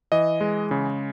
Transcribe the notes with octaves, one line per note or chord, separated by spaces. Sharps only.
E3 D#5
G#3
C#3